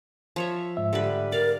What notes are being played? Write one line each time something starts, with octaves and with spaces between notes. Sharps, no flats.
F3 C#5 E5
G#2 E5
D3 G3 B4
A#4 D5 F5